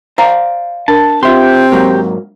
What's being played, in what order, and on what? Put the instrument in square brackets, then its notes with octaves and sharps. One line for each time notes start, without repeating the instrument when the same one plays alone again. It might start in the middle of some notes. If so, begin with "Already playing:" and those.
[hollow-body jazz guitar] C5 D5 F5 [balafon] A#5
[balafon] D4 A#4 [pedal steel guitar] A5
[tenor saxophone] C4 [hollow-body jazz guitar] F4 E5 C6 [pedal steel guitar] G4
[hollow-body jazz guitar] G#2 F#3 A#3